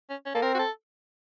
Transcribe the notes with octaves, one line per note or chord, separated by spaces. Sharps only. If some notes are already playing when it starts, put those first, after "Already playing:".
C#4
C#4
A#3 A4
C4 A#4
F#4
A4